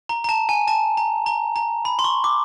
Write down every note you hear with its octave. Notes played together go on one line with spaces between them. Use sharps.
A#5
A#5
A5
G#5
A5
A#5
A#5
A#5
B5
C6
C#6
D6